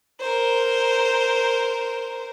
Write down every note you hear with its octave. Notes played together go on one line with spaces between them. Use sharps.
A#4 C5